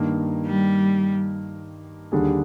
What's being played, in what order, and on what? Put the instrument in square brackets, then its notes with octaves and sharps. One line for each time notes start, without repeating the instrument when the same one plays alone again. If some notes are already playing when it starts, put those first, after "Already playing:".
Already playing: [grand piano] G2 D#3 A#3
[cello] G3
[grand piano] D#2 D3 G3 D4 G#4